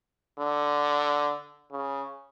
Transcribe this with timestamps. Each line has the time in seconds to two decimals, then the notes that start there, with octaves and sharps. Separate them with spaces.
0.39 D3
1.72 C#3